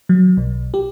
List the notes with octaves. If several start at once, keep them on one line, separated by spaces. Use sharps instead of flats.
F#3
B1
G4